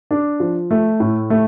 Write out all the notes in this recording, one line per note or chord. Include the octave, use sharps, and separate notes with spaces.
D4
F3
A3
A2
A3